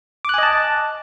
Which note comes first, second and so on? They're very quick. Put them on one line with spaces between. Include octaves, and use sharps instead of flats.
D6 F#6 G#5 D#5 A5